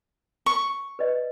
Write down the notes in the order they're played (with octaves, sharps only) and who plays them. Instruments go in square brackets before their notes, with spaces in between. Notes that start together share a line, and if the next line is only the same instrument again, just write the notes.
[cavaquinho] C#6
[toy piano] B4 D5 D#5